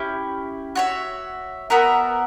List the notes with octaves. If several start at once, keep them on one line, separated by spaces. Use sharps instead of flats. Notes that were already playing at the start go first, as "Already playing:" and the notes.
Already playing: C#4 E4 G4
F#4 C#5 E5
B3 F#4 A#4 E5